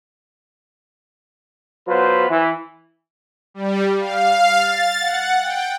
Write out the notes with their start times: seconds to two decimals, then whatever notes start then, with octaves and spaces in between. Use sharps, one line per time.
1.88 F#3 B3 F4 B4 C5
2.29 E3
3.54 G3
3.99 F5
4.57 A6
4.99 F#5
5.42 G5